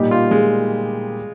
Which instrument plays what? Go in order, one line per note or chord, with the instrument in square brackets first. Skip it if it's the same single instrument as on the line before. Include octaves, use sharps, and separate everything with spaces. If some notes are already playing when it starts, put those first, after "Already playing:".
Already playing: [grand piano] A#2 G3 A#3 D#4 G4
[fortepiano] F4
G#3